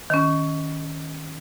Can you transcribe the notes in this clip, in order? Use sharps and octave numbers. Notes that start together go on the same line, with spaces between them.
D#3 C#4